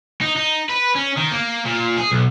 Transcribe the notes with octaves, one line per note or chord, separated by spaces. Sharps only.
D#4
D#4
B4
C#4
D#3
A#3
A#2
G#4
B1